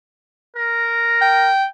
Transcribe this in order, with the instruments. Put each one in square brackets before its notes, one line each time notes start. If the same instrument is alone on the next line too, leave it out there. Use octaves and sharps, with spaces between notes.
[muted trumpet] A#4
[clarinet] G5